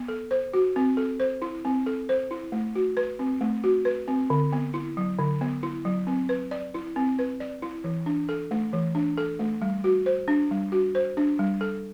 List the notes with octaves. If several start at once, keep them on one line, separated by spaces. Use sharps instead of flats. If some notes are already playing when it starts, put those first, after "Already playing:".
Already playing: B3
A4
C5
F#4
C4
A4
C5
E4
C4
A4
C5
E4
A3
F#4
B4
C4
A3
F#4
B4
C4
D3
B3
E4
F#3
D3
B3
E4
F#3
C4
B4
D5
E4
C4
B4
D5
E4
E3
D4
A4
A3
E3
D4
A4
A3
G3
F#4
C5
D4
G3
F#4
C5
D4
G3
A4